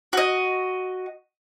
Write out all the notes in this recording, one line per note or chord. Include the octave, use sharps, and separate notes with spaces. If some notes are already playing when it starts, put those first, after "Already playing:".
F#4 D#5